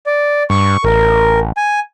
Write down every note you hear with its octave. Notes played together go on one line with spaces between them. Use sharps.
D5
G2 C#6
A1 A#4
G#5